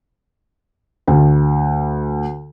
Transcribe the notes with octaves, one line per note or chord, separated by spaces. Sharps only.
D2